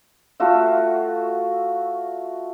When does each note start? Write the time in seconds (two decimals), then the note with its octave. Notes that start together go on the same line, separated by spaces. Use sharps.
0.40 A3 F4 F#4 E5